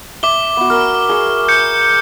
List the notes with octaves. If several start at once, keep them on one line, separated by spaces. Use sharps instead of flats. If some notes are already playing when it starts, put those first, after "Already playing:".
E5 D6 G7
B3 F#4
A#4 F6
G#4 C#6
G6 C#7